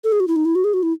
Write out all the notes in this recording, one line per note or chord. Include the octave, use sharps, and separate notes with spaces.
A4
G#4
F#4
E4
D#4
E4
F#4
G#4
F#4
E4